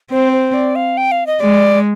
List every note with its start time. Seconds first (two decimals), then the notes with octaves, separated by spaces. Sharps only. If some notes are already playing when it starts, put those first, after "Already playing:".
0.11 C4 C5
0.33 C5
0.54 D5
0.76 F5
0.97 G5
1.12 F5
1.27 D#5
1.40 G#3 D5